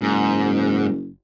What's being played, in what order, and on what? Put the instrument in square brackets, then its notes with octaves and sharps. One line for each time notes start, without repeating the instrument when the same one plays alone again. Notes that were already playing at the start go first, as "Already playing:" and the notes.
[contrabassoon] F#1 [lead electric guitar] G#2